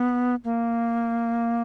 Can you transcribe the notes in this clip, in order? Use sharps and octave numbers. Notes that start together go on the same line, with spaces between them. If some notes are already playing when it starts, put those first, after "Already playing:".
Already playing: B3
A#3